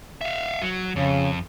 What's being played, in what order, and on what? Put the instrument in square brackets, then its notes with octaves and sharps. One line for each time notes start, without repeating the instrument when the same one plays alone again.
[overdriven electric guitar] E5 F5
F#3
[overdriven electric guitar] F2 [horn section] C#3